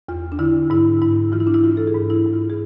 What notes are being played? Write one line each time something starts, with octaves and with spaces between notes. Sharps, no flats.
E2 F4
D4
D3 E4
G#2 E4
G#2 E4
E3 F4
E4
D4
E4
E3 F4
A4
G#4
G#2
E4
G#2
F4
G#4